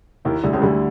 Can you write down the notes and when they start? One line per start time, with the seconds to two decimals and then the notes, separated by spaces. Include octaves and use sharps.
0.25 D#2 D#3 E4
0.43 D2 D3 G3
0.53 C#2 C#3
0.62 D2 D3 G3